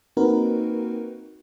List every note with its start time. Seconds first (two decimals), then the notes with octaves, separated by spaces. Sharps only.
0.17 A#3 C4 D#4 F#4 A#4 B4